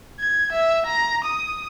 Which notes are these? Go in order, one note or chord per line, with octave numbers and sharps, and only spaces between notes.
G#6
E5
A#5
D#6